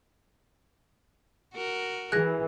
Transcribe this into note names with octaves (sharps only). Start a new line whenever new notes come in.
F#4 A#4
E3 G#4 F#6 A#6